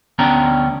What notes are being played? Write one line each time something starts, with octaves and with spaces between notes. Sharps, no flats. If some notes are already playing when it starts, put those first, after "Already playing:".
D2 B3 C#4 D4 G5 A#5